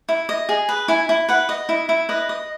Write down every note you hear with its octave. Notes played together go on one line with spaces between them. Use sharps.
E4
D#5
G#4
B4
E4 G#5
E4
B4 F#5
D#5
E4
E4
B4 D#5
D#5